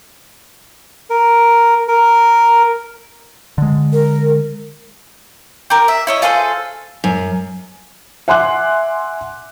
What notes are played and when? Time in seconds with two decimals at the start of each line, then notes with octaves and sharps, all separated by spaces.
1.10 A#4
1.88 A#4
3.58 D3 G#3
3.93 A#4
5.70 G4 A#4
5.88 E5
6.07 E4 C#5 D#5
6.22 F4 G#4 A4 C5
7.04 F#2
8.28 E5 F#5 G#5 C6 D6 F#6